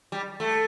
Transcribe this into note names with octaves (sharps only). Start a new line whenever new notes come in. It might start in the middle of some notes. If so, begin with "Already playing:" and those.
G3
A3